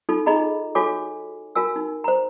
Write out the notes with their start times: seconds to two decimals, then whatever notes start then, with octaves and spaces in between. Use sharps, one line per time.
0.09 D#4 F4 A4
0.26 D#4 G#4 D#5 A#5 B5
0.75 F#4 A4 C#5 G#5 D6
1.55 F#4 A#4 G#5 E6
1.76 D#4
2.04 C5 A#5